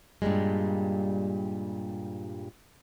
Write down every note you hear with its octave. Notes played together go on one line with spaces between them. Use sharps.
G2 A#2 C#3 G3 G#3